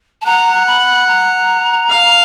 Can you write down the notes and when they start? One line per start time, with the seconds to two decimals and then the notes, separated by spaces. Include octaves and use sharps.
0.21 A5
0.25 F#5 A#5
0.67 B5
1.07 A#5
1.90 F5